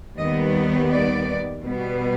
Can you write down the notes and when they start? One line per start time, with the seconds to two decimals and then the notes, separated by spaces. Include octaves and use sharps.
0.18 D#2 D#3 G3 B3 D#5
0.90 D5
1.62 B2 G3 B3